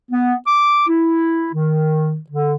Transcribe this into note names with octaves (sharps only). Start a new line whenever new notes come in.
B3
D6
E4
D#3
D3